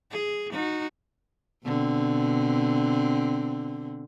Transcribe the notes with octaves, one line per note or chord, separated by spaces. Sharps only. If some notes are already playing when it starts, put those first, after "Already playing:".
G#4
D#4 F#4
B2 D3 C4